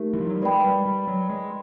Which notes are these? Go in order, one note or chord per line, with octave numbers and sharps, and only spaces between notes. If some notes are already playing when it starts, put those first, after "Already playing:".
Already playing: A3 D#4 G4 A#4
E3
F3
F#3
G3
G#3 B4 D5 G5 B5
G#3
G3
G3
F#3
G#3